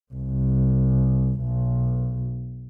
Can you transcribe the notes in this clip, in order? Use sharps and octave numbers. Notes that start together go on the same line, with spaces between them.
C2
B1